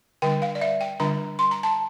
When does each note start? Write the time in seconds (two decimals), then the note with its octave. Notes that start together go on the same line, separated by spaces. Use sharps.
0.22 D3 G3 D4 G5
0.42 F5
0.55 D5
0.61 E5
0.81 G5
1.00 D3 G3 D4 A#5
1.39 C6
1.51 A#5
1.63 A5